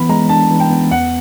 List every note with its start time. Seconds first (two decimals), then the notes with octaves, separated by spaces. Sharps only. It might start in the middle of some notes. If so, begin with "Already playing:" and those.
Already playing: E3 B3 B5
0.09 G#3 A#5
0.29 D4 A5
0.50 E3
0.60 G5
0.70 B3
0.91 E2 F#5